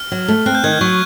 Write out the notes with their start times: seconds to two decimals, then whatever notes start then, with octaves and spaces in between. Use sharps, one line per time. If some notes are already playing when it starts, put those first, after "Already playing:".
Already playing: F6
0.12 F#3
0.28 A3
0.46 C4 F#6
0.55 G6
0.64 D#3 G#6
0.72 G6
0.81 F#3 C#6